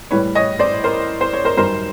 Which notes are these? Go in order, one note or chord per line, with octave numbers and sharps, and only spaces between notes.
A2 E3 G3 B4 C#5
C#5 D#5
C5 D5
A#4 C5
C5
C#5
A#4 C5
F#2 D#3 G3 A#4 C5